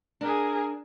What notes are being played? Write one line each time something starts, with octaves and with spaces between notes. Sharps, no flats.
D4 G#4 A#4